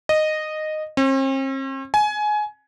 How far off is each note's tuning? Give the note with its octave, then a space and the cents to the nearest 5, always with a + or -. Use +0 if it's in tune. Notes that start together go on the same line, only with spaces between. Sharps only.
D#5 -10
C4 +45
G#5 +20